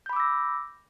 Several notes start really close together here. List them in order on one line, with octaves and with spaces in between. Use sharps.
G6 B5 D6 E6 A#6